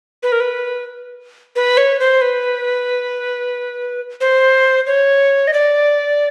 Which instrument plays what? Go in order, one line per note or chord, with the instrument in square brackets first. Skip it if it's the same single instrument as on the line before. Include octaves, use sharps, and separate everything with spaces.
[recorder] B4
A#4
B4
B4
C#5
C5
B4
C5
C#5
D#5
D5